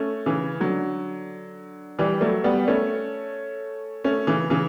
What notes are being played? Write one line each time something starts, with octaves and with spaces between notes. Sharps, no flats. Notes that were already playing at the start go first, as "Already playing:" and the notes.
Already playing: A3 C#4
C#3 E3
D3 F#3
E3 G3
F#3 A3
G3 B3
A3 C#4
A3 C#4
C#3 E3
C#3 E3